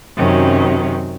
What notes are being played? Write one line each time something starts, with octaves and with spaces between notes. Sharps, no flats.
F#2 C3 D#3 F#3 C#4